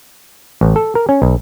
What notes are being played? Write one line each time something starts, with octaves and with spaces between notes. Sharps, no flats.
A1
A4
A#4
C#4
B1